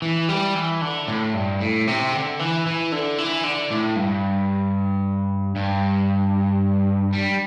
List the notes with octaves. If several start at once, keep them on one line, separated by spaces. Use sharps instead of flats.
E3
G3
E3
D3
A2
G2
A2
C3
D3
E3
E3
D3
E3
D3
A2
G2
G2
G3